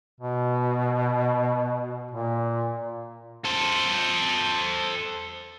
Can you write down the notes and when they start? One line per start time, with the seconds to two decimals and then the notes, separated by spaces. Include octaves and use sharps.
0.21 B2
2.11 A#2
3.45 A4 C5